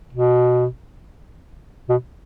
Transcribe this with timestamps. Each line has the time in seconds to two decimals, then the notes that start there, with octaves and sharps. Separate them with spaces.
0.13 B2
1.89 B2